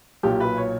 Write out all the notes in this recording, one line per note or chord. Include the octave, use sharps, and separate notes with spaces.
B1 A#2 F#3 G4
B4
C#5